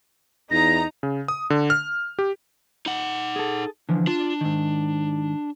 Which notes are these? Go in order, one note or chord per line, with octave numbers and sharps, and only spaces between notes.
E2 D#4 A#5 A#6
C#3
D#6
D3
F6
G4
D#4 F#5
G#4 A4
D3 E3 F3
D4 F4
G#2 D#3